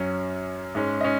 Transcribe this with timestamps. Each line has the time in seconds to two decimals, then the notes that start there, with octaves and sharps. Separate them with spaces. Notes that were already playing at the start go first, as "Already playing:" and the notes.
Already playing: F#2 F#3 C#4
0.75 G#2 G#3 C#4
1.01 D#5
1.04 C#4